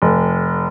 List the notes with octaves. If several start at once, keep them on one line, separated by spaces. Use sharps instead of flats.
F1